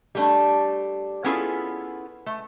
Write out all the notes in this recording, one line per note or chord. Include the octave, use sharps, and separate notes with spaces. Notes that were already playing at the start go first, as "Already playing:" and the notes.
G3 A3 D4
B3 C#4 E4 F4 G#4 A4
A3